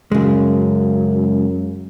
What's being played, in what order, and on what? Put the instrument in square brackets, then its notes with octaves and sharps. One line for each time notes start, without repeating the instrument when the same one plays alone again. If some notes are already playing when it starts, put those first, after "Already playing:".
[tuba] F#2 [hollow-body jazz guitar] C#3 G#3